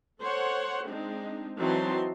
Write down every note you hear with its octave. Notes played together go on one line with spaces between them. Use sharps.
A4 C5 C#5 F#5
G#3 C4 D4 D#4
E3 F#3 C4 D#4 A5 C6